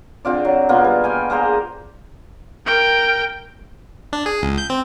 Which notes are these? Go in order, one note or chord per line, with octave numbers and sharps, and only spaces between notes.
D3 C4 F4 D5
F#3
B2 A#3 B3 F4
G3
D5 G5 G#5
A#3 G#4 C5 A#5
A#4 G5
D4
G#4
C#2
G6
C4